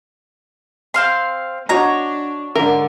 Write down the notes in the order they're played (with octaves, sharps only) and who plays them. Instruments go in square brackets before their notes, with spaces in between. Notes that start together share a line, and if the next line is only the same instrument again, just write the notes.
[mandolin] C4 F5 C6
[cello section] D4 [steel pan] F#4 D#5 [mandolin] C#5 A#5
[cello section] G#2 D3 [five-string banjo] A#4 [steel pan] E5